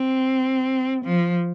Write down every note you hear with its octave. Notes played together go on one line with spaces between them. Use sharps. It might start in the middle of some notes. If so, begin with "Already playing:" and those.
Already playing: C4
F3